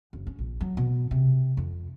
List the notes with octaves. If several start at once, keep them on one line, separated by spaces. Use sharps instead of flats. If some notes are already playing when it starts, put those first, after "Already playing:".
F#1
C#4
A#1
F#3
B2
C3
F2